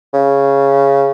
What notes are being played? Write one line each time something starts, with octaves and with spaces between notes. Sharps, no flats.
C#3